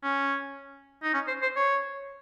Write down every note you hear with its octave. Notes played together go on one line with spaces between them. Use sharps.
C#4
D#4
C#4
C5
C5
C#5